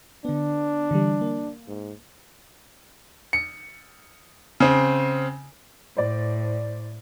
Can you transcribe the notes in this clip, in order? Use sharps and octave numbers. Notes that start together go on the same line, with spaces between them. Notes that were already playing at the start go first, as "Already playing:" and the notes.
D3 B3 D4
D3 E3 G3
A#3
G#2
C#7
C#3 C4
A2 C5 D5